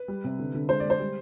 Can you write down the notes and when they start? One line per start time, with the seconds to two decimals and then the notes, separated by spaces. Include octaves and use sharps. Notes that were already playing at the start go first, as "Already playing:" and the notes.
Already playing: B4
0.08 G3
0.24 C3
0.39 D3
0.54 D3
0.69 G#3 C5
0.80 D5
0.85 G#3
0.90 C5
1.00 G3